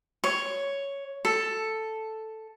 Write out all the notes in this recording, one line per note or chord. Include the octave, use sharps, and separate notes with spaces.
C#5
A4